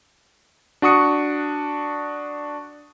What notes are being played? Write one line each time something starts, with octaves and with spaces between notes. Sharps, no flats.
D4 F#4 C#6 D#6 C#7